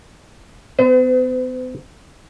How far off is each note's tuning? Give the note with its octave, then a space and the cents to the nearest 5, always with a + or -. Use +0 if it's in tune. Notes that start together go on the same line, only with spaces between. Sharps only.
B3 +40 C5 -45